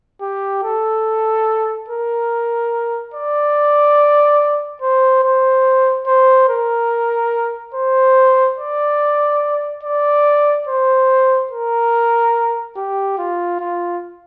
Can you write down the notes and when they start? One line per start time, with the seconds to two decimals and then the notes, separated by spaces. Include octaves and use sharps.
0.22 G4
0.63 A4
1.88 A#4
3.14 D5
4.82 C5
5.24 C5
6.07 C5
6.49 A#4
7.74 C5
8.58 D5
9.84 D5
10.67 C5
11.51 A#4
12.76 G4
13.18 F4
13.60 F4